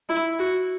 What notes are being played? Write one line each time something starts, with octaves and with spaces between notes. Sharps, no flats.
E4
F#4